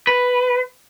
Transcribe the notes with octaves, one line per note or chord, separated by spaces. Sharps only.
B4